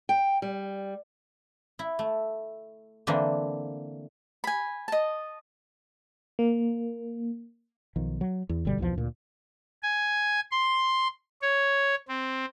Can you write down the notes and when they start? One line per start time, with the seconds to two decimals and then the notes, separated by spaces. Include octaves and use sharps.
0.09 G5
0.42 G3
1.79 E4
1.99 A3
3.07 D3 E3 A#3 C4 D4
4.44 G#5 B5
4.88 D#5 A5
6.39 A#3
7.96 B1 D#3 F3
8.21 F#3
8.49 E2
8.65 G1 B2 D3 G3
8.78 B1 E2 B2 F3
8.95 D2 A#2
9.83 G#5
10.52 C6
11.42 C#5
12.08 C4